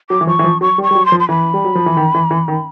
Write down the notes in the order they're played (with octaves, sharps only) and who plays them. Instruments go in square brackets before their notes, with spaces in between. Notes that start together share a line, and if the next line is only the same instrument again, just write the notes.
[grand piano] F#3 [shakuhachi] D6
[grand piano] E3
[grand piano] F3 [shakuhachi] C#6
[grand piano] E3
F3
[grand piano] F#3 [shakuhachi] C#6
[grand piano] G3
[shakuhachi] C#6
[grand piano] G3
F#3
[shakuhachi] C6
[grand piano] F3
[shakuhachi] C6
[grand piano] E3 [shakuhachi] B5
[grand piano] G3
F#3
F3
E3
D#3
E3
E3
D#3